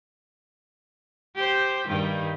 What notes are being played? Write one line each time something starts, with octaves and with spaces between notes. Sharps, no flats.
G4 C5
G2 D#3 G3